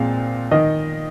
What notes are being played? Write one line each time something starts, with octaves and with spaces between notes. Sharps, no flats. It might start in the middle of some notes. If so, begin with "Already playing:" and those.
Already playing: A#2 F3 G#3 C4 F5
D#3 D#5